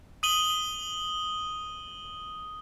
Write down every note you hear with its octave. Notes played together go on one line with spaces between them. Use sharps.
D#6 D#7 F#7 G7